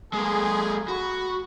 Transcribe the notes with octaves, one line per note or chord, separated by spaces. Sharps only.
G#3 A#3 G#4
F#4 B5